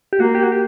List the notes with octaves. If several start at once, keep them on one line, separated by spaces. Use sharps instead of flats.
G4
A#3 F#4
G4
F#4
G4